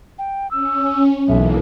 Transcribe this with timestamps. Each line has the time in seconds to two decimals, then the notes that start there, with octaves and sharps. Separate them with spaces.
0.19 G5
0.51 C#4 E6
1.28 B1 E3 A#3 E5